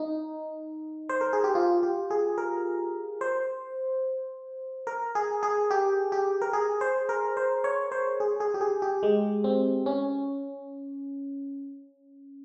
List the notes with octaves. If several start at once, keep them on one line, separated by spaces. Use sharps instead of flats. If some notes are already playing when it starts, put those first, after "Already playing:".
Already playing: D#4
C5
A#4
G#4
G4
F4
G4
G#4
A#4
C5
A#4
G#4
G#4
G4
G4
A#4
G#4
C5
A#4
C5
C#5
C5
G#4
G#4
G4
G#4
G4
G#3
C4
C#4